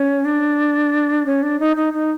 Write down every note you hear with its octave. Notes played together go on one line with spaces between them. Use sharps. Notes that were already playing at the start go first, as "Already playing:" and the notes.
Already playing: C#4
D4
C#4
D4
D#4
D#4
D#4